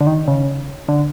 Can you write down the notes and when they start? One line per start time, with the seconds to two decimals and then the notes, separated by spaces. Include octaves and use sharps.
0.01 D3
0.07 D#3
0.28 C#3
0.89 D3